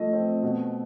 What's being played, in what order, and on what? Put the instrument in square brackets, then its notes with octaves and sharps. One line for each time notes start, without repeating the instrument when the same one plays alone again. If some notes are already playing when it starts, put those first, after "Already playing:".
Already playing: [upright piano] F3 A3 D#5
C4
B2